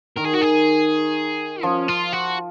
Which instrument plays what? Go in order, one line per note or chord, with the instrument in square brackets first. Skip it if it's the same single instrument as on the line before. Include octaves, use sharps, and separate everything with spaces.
[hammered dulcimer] D#3 [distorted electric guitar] A#4
[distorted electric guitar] G#4
F#4
G#4
[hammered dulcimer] F3 [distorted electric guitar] C#4
[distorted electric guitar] F4
F#4